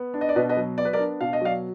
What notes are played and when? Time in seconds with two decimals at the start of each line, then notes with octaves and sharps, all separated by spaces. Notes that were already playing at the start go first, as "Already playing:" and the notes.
Already playing: B3
0.14 D4
0.21 D#5
0.29 D5
0.36 B2 B4 D#5
0.49 B4 D#5
0.57 F#3
0.78 B3 D5
0.85 B4
0.93 A#4 D5
0.99 D4
1.21 B2 F5
1.33 D#5
1.41 F#3 D5 F5